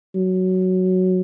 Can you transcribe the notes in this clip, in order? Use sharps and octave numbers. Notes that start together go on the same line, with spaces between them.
F#3